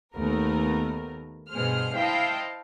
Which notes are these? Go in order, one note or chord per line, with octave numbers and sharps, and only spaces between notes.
D#2 A3 B3 A#4
G2 B2 G#4 C5 F6
E4 C5 D#5 F5 G5 A5